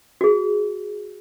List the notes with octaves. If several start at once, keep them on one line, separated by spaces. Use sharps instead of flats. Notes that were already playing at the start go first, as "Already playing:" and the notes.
F#4 G#4